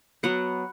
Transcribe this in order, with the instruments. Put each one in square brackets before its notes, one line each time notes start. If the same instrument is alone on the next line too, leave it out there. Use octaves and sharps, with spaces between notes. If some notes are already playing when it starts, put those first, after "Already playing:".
[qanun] F#3 B3 F#5